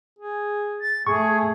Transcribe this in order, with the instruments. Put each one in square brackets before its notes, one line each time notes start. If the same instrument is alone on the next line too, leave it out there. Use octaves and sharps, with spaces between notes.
[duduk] G#4
[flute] A6
[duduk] A3 [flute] G#4 [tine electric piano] C#6